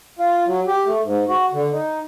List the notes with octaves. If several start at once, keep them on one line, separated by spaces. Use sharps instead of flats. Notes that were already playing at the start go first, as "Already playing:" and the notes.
F4
F#3
G4
A3
G#2
F#4
D3
D#4